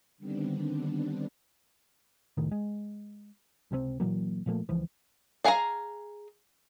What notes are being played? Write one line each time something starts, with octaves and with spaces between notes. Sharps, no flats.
D3 D#3 G3 B3 C4 D4
F1 C2 A2 D#3
G#3
C#2 C3 G3 C4
A#2 E3 F#3 A#3
A#2 F3 A3 A#3
C#2 E3 F3
D4 G#4 F5 G#5 A#5